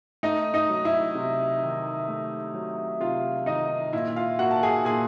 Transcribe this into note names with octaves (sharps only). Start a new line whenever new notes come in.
A3 D#4 D#5
D#4 D#5
F#3
E4 E5
C3
D#3
A3
F#3
C3 F4 F5
D#3 D#4 D#5
A#2 E4 E5
F4 F5
A#3 F#4 F#5
A5
G#4 G#5
A#2 G#4 G#5